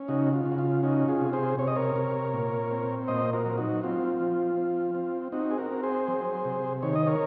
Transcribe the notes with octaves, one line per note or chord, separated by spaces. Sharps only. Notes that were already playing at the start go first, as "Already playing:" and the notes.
Already playing: C#4
C#3 D#4 F#4
F4
C#3
F#4
F4
C#4 D#4 F#4
F4 G#4
C3
G#4 C5
C3 C#5
D#5
A#4 C#5
C3
A#2
C4
A#2 C5 D#5
F#4 A#4
F#3
D#4 F#4
C4 F4
F3
C4
C4
C4 D#4 F#4
G#4
F#4 A#4
C4
G#4 C5
F#3
C3
D#3 C#5
D#5
A#4 C#5